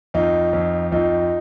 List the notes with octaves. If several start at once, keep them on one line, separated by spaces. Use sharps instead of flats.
F2 D#4 F4
F2
F2 D#4 F4